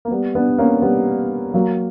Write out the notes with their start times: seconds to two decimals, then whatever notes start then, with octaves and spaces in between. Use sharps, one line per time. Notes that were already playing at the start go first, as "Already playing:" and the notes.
0.05 A#3
0.11 G3 B3
0.35 B3 D4
0.58 A#3 C#4
0.82 G3 B3
1.54 F#3 A#3